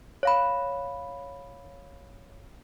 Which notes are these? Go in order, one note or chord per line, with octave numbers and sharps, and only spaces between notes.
C#5 F5 B5